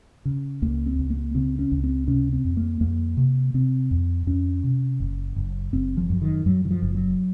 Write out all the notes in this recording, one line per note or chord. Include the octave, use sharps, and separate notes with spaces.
C#3
C#2 A#3
C4
C#2
A#3
C#3 C4
C#4
C#2
C4
C3 C#4
C4
F2
A#3
F2 A#3
C3
C3 C4
F2
F2 C#4
C3
F#1
F#1
F#1 C4
F3
F#2
D#3
F#2 F#3
D#3
F3
F#1
F#3